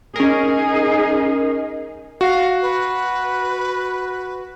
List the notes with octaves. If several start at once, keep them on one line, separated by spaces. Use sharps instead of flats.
C#4 D#4 G#4 A#4
F#4 F5
B4